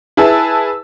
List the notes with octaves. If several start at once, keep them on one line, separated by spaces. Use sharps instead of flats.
E4 G#4 B4 A5 E6